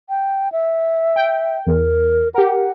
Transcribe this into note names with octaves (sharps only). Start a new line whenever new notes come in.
G5
E5
G5
E2 A#4
G4 A#4 F#5